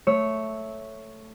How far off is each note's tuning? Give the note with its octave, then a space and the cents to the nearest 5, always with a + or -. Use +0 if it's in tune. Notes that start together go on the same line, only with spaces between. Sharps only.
A3 +0 C#5 +0 E6 -15